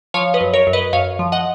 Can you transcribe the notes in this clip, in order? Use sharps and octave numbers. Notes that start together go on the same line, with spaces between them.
F3 C#5 F5
B4 D#5
F#2
A#4 C#5
F#2
B4 D#5
F#2 C#5 F5
F3
D#5 F#5